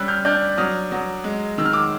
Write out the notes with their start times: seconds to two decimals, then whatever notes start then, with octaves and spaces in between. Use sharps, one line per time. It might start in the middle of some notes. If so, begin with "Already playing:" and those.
Already playing: G3 C#4 E6 F#6
0.08 F6 G6
0.25 D4 F6 G6
0.58 F#3 D#6 F6
0.92 F#3
1.24 G#3
1.58 D#3 E6
1.66 F6
1.73 D6 E6